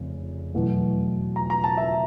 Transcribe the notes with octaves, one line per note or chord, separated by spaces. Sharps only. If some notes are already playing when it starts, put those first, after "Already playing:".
Already playing: F1 C#3
E2 B2 F#3 A3
A#5
A#5
A5
E5